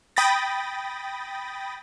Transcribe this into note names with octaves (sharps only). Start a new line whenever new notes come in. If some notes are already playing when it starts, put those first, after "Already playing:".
G5 B5 D#6 A6 A#6